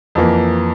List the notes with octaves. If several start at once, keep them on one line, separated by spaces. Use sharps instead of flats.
F2 E3 A#3